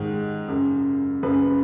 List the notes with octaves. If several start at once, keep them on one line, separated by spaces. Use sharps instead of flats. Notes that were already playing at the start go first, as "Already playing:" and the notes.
Already playing: G#2 D#3
F#2 C#3
F#2 C#3 B4